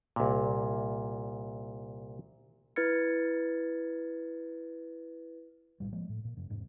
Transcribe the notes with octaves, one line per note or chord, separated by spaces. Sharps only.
C2 A#2
E4 B4 F6 G#6 A6 C#7
A#1 D#2 A2 G3
F3 G#3 A#3
A2
A#2
F#2 C#3
E2 G#2 C3